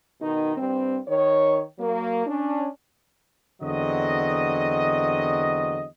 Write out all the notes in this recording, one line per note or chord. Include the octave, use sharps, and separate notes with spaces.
B2 D#3 D#4
G2 G3 C4
D#3 C#5
F#3 A#3
C#4 D4
E2 D3 F#3 C4 D#5